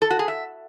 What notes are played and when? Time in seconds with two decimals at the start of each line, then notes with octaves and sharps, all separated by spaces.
0.02 A4
0.10 F#4
0.19 G#4
0.28 E5